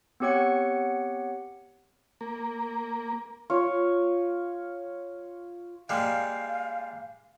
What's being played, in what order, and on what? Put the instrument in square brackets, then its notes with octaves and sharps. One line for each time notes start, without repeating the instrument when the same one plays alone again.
[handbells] B3 C4 G4 C#5 F#5 C#7
[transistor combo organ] A#3
[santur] F4 C#5
[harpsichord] G3 G#3 A#3 [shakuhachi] F5